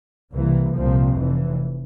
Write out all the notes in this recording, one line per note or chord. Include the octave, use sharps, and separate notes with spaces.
C2 C3 E3 A#3
C2 A#2 F3 C4
F1 F2 E3